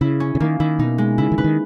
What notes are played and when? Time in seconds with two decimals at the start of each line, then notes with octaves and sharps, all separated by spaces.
0.01 C#3 E4
0.20 C#4
0.35 C#3
0.40 D#3 A#3
0.60 D#3 E4
0.79 B2 D#4
0.98 G#3
1.18 C#3 E4
1.32 D#3
1.38 C#3 B4
1.44 D#3